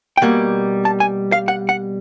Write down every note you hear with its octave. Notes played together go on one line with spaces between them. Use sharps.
G5
B2 G3 A#3 F#5
A5
G#5
F5
F#5
F#5